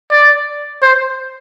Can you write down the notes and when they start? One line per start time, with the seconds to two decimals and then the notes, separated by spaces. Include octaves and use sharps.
0.11 D5
0.82 C5